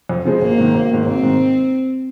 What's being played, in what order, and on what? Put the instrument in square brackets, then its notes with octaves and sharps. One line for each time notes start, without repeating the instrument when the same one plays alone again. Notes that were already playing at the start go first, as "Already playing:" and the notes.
[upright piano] F2
C#3 F3 G#3
[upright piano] G#1 [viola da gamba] A#3
[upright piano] G#2 D#3
G#1
G#2 D#3
[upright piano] G#1 [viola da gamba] C4
[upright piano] G#2 D#3